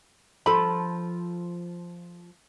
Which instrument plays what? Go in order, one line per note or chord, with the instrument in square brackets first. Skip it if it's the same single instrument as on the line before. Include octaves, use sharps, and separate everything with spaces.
[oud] F3 A4 [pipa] B5